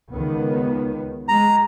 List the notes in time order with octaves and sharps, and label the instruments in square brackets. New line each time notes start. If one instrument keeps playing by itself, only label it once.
[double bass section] C#2 D#3 B3
[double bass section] G#3 [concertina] A#5